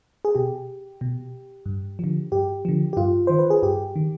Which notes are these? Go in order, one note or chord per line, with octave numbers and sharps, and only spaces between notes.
G#4
B2 G4
B2
G2
D3 F3
G2 G4
D3 F3
G4
G2 F4
D#3 C5
B4
G#4
G2 G4
D#3